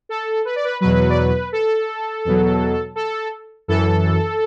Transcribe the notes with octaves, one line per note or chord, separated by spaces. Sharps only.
A4
B4
D5
B4
E2 B2 F#3 B4
D5
B4
A4
E2 B2 F#3
A4
F#2 E3 A4